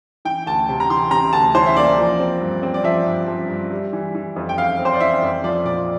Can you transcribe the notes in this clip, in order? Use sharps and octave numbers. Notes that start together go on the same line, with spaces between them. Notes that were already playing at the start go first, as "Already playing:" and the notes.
E3 G5
D2 A5
C3
A#5
E3 C6
C3 A#5
D2 A5
E3 C5
E5
A#3 D5
F3
C4
G2
C4
D5
F3 E5
G2
F3
G2
G3
E3
E3
F2
G5
F2 F5
C4
C5
D5
E3 E5
F2
F3 D5
A#2 D5